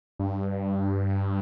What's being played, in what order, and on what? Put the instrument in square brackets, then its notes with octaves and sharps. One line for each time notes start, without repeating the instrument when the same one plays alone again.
[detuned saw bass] G2